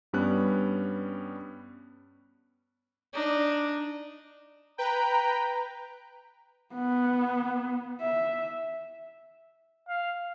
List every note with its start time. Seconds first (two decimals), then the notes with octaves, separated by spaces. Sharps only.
0.13 G2 G3 B3 C#4 F#6
3.14 D4 D#4
4.78 B4 G5 A#5
6.74 B3
8.01 E5
9.89 F5